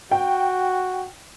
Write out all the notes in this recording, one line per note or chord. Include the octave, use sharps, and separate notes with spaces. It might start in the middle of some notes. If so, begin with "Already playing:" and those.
F#4 G5